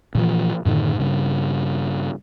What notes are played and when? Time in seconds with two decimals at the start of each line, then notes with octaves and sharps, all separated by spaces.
0.15 A#2 E3 F3
0.65 F#2 A2 D3 D#3
0.99 G2 C#3